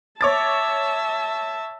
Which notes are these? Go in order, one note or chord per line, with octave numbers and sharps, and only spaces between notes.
C#5 E5 A5 D6 A6